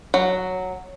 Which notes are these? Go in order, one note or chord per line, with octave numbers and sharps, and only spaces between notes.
F#3